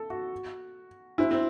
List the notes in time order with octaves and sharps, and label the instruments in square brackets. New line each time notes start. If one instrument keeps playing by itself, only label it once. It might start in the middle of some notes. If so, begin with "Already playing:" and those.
Already playing: [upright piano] A4
F#4
[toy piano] D4 F#4 C5 [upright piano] E4
[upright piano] C4